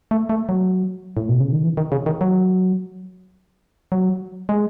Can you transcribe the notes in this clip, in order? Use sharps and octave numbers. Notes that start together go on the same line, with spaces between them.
A3
A3
F#3
A2
B2
C#3
D#3
E3
D#3
C#3
D#3
F#3
F#3
G#3